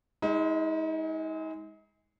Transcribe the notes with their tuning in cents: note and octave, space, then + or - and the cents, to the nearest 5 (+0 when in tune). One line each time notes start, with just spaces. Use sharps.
G#3 -15 D#4 +40